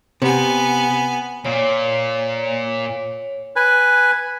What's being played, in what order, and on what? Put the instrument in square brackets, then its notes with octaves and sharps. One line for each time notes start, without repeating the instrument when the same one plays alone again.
[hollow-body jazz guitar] C3 [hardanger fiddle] B3 G#5
[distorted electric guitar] A#2 [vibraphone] C#5
[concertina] B4 G#5